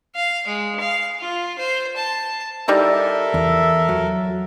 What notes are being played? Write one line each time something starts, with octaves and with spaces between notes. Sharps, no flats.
F5
G#3
F5
F4
C5
A5
G3 D#4 E4 A4 A#4 E5
E2
F#3